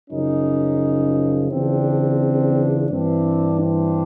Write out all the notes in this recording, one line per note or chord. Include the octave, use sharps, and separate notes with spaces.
F#2 C#3 F3 C#4 D#4
E2 C#3 F3 C4 D4
G2 E3 C4 D4
C4 D4